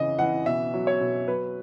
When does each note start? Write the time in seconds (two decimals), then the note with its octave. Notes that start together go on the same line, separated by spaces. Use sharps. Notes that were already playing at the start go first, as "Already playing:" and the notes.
Already playing: C#3 E3 D#5
0.19 E3 F#5
0.46 B2 E5
0.74 F#3
0.87 C#5
1.01 B2
1.28 F#3 B4